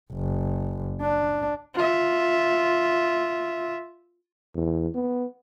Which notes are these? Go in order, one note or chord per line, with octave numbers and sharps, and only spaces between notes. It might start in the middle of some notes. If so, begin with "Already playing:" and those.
F#1
D4
F4 E5
E2
B3